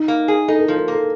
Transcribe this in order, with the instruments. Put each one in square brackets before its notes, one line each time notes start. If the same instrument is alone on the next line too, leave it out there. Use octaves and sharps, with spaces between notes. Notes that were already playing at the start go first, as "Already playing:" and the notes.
Already playing: [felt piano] D#4
[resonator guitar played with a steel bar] A#3
G#4
[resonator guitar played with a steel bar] D#4 [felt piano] A4
[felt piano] A#4
A4
[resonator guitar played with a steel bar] F3
[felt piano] A#4
[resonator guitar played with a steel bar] A#3
[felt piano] A4